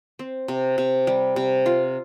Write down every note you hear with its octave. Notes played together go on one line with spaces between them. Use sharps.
C4
C3
C3
G3
C3
F4